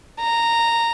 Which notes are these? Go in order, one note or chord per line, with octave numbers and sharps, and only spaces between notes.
A#5